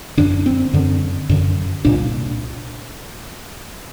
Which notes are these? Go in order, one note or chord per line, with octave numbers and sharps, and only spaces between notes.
F#2 D3 D4
C4
F#2 D3
F#2 D3
C2 A#2 D4